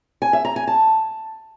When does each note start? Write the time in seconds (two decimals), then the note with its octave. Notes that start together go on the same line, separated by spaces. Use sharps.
0.22 G#5
0.33 E5
0.45 A#5
0.56 G#5
0.67 A5